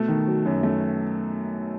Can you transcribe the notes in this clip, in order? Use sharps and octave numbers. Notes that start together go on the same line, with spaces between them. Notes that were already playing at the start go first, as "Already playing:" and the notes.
Already playing: B2 A3
D#3
F#3
F#2
A3